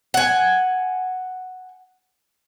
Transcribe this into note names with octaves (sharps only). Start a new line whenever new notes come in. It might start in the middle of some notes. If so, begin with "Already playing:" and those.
F#5 G#5